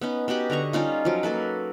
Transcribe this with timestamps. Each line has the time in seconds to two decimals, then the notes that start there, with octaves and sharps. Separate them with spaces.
0.01 B3 C#4 D#4
0.28 B3 F#4 G4 B4
0.50 D3 D#5 A#5 C#6
0.73 G3 C#4 D#4 F4
1.05 F3 F#3
1.23 A#3 F#4 A4 B4